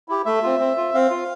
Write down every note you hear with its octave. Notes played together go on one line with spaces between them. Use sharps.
E4 G4
A3 E5
C4 F4
C4
F4
C4 F5
F4